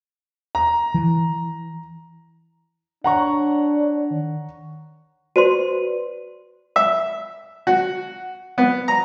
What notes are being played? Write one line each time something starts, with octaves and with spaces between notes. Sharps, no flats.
A#5
E3
D4 C#5 F#5 A#5 C#6
D#3
F#4 B4 C5 D5 C6 D#7
E5
F#4
B3
A#5